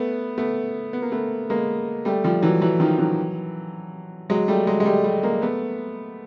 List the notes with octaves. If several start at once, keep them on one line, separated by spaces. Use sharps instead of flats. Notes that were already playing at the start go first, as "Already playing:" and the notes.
Already playing: A3 B3
A3 B3
B3
A#3
A3 B3
G#3 A#3
G3 A3
F3 G3
E3 F#3
E3 F#3
D#3 F3
E3 F#3
F#3 G#3
G3 A3
F#3 G#3
G#3
G3 A3
G3 A3
G#3 A#3
A3 B3